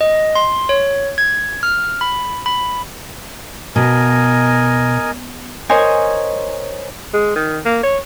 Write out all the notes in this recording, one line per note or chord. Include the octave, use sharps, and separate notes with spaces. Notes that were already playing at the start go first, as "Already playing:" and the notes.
D#5
C6
C#5
G#6
F6
B5
B5
B2 A#4 D#5 G#5
A#4 C5 C#5 D#5 G#5
G#3
D#3
A#3
C#5